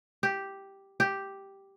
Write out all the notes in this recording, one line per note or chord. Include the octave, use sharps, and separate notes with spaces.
G4
G4